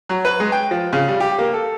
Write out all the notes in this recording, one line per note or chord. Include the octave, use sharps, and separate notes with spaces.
F#3
B4
G#3
G5
F3
C#3
G3
G4
A#3
A4